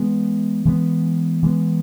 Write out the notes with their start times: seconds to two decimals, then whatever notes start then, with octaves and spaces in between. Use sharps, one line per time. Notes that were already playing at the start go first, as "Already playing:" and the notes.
Already playing: E3 G#3 B3
0.65 E3 G#3 B3
1.42 E3 G#3 B3